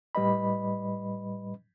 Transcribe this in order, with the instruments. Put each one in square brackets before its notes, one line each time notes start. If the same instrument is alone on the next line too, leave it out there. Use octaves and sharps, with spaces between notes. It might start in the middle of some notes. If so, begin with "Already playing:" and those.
[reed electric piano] A2 G3 B4 D#5 B5